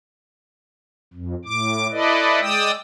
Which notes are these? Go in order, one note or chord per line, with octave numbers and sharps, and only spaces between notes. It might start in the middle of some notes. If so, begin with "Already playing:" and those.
F2
A2 D6
E4 A4 B4 D5 D#5
G#3 D5 G5 D#6 E6